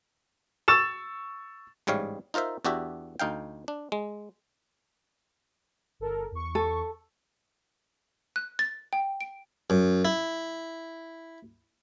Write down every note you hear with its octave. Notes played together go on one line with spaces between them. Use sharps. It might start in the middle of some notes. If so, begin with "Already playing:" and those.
C#6 E6 A6 E7
A1 G#2 G3 C#5 F5
D#4 F4 A#4 C5 E5
E2 D4 F#4 G4 E5
D2 D#4 F5 G5
D4
G#3
G1 A4 A#4
E2 C#6
A4
F#6
A6
G5
D7
F#2
E4